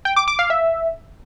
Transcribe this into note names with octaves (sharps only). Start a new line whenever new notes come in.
G5
D6
D6
F5
E5